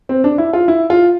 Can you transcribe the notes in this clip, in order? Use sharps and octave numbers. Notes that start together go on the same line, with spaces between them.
C4
D4
E4
F4
E4
F4